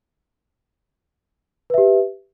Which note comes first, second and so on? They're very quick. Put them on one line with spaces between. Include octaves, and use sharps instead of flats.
B4 E5 G4